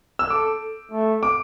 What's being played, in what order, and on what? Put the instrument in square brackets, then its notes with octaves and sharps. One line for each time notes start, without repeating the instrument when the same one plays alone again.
[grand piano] E6
[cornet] A4 [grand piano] D6
[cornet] A3
[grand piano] D6